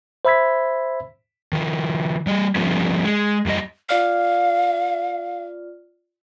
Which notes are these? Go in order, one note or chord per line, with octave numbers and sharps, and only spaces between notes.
C5 E5 B5 E6 G#6 B6
D#3 F3
G3 D#5
F3 G3 A3 B3 C#4
G#3
F#2 G3 F#4 D#5
F4 D5 F5 F6